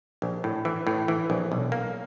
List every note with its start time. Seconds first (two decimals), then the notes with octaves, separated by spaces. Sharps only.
0.22 A#1
0.44 A2
0.65 E3
0.87 A2
1.08 E3
1.30 A#1
1.52 B1
1.72 A#3